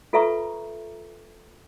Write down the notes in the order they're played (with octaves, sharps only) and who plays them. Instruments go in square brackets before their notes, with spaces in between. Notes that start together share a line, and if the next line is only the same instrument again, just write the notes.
[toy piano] F4 A4 B4 E5 A#5 C#6